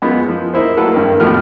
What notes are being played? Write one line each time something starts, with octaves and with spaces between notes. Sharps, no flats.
F#2 G#3 B3 F4
F3
A#3 D#4 E4 C5
F#3 A3 A4 B4 F5 F#5
G2 D#3 A#3
G#1 E2 A2 F3 F#4 F6